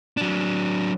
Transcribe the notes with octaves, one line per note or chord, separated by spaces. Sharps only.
F#3 D4